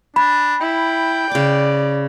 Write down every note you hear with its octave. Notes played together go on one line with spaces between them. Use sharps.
D4 G#5 B5
E4 G5
C#3 D5 D6